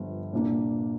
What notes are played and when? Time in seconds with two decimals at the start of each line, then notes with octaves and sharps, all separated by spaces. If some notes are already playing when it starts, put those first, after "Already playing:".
Already playing: G1 G2 F3
0.33 C2 A#2 A#3 D4